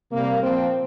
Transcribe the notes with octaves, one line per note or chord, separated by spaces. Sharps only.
C3 G3 A#3
A#2 F3 C4